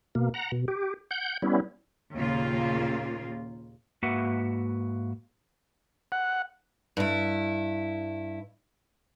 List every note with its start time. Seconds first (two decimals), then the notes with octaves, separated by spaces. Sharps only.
0.15 B2 A#3
0.34 F#5 A#5
0.52 B2
0.68 G4
1.11 F#5 G6
1.42 G3 B3 C#4 E4
2.15 D#2 A#2 C#3 A#3 F4
4.02 G#2 A#3 F#4 B4 E5 F#5
6.12 F#5
6.97 G2 E4